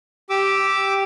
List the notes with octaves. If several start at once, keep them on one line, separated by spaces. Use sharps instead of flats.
G4 D6 E6